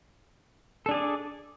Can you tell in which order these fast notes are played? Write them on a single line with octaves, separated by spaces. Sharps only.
A4 D4 G#4 D5